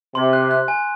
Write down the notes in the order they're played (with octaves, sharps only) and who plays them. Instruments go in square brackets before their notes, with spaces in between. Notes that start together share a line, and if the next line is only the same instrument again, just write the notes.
[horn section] C3 [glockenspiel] C6
[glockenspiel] F#6
F#6
G#5